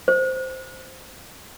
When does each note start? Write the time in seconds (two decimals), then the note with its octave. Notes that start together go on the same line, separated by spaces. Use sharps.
0.08 C5